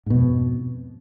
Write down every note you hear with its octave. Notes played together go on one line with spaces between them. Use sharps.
F2 G#2 B2